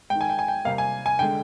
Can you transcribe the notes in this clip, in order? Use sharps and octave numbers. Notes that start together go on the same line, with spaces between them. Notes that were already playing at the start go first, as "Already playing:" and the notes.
G#3 G5
D#3
G#5
G5
G#5
G5
C3 G3 A#3 F5
G#5
G#5
D3 G#3 G5